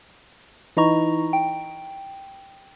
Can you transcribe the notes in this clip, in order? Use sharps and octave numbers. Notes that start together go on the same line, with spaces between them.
E3 D#4 E4 D#5 A#5 C#6
G5